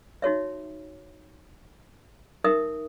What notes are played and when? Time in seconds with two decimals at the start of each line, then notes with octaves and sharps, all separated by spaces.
0.22 D#4 F#4 C#5 E5
2.44 D#4 A#4 E5 D#6